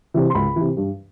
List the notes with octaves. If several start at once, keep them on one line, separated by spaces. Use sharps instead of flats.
C3 E3
C6
C#2 B5
C3 E3
G2